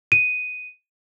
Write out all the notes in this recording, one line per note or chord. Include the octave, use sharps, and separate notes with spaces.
D#7